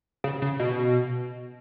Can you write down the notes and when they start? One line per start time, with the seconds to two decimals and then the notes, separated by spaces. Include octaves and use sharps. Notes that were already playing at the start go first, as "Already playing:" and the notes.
0.24 C#3
0.42 C#3
0.60 B2